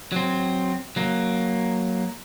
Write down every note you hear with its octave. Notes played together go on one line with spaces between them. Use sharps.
F#3 C4
F#3 A#3